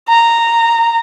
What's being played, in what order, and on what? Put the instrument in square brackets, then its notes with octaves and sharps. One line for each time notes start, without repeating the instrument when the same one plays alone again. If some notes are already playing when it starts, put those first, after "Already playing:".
[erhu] A#5